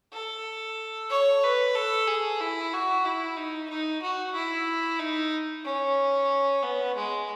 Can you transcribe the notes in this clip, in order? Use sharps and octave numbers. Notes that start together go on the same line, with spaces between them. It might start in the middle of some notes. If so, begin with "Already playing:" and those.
A4
C#5
B4
A4
G#4
E4
F#4
E4
D#4
D#4
F#4
E4
D#4
C#4
B3
G#3